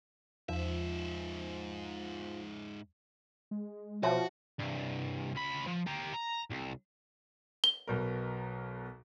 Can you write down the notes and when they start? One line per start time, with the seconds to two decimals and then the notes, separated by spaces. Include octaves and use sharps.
0.49 E2 G#2 F3 E5
3.51 G#3
4.03 B2 F3 F#4 C#5 E5 A5
4.60 C2 G2
5.35 C#2 B5
5.67 F3
5.87 G4 A#4
6.13 A#5
6.51 C2
7.64 G7
7.87 B1 B2 A#4